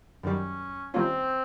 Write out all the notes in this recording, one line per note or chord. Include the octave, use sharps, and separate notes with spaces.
F#2 D#3 G3 C#4
D#3 G3 A#3 C4 C#4 F4